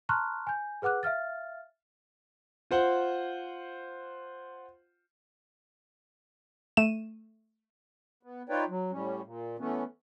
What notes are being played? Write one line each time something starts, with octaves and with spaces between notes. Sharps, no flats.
A5 A#5 C6 C#6 F6 F#6
G#5 G6
G#4 B4 F#5 D6 F#6
E5 F5 F6 A6
F4 C5 F#5
A3 D#7 E7
B3
D#4 F4 B4 C#5 D5 G5
F#3
A2 G3 C#4
A#2
E3 A3 B3 C#4